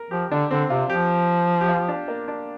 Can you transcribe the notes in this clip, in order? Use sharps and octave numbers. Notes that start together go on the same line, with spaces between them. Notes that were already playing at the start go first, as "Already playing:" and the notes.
Already playing: A#4
F3 G4
D3 D4
D3 C4
C3 F4
F3 G4
G4
F4
D4
A#3
D4